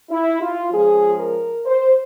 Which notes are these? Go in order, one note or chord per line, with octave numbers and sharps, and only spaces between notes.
E4
F4
F3 G#3 C#4 G#4
A#4
C5